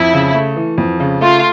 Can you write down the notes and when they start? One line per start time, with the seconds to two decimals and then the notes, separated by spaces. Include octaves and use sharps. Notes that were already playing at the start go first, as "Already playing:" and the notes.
Already playing: F2 E4
0.13 C#3
0.34 A3
0.57 E3
0.78 F2
1.00 C#3
1.21 A3 F4